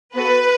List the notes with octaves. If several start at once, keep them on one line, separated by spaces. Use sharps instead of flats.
B3 F#4 A4 B4